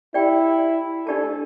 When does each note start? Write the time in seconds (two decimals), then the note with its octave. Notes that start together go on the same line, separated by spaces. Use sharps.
0.14 E4 G4 D5 G5
1.07 D4 G4 A4 D5 A5